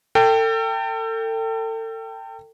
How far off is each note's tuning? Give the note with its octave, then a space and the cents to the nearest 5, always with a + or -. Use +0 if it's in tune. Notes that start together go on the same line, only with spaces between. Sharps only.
A4 +35 G5 +0